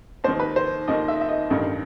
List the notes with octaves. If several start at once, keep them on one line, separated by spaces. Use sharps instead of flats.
D#2 D#3 C5
B4
C5
D#2 D#3 D#5
E5
E5
D#5
A1 G2 D#3